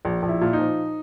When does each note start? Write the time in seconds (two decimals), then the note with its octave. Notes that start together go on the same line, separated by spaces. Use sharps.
0.05 A#1
0.23 A#1
0.29 E4
0.41 A#2
0.53 D#4
0.59 F3